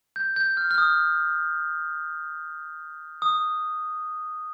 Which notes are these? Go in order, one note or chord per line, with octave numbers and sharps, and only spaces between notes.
G6
G6
F6
F6
D#6
D#6